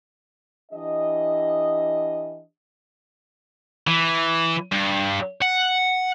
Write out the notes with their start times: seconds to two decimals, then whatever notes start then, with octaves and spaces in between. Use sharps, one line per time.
0.72 E3 D4 G4 D#5
3.87 E3
4.72 G2
5.42 F#5